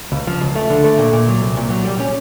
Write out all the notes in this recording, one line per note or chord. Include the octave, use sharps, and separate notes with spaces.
C#2
F3
C#2
A3
D3
A3
A#2
A#2
F#3
C2
A#2
F#3
G3
C#4